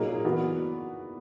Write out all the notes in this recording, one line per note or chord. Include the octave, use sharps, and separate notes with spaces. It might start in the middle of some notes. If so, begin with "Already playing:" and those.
Already playing: A#2 F#3 A#3 D#4 G#4
E3 B3 F#4